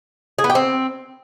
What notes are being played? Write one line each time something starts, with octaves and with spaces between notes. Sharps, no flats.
G#4
B3
G4
C4